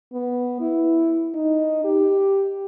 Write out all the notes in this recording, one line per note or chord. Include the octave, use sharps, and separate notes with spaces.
B3
E4
D#4
G4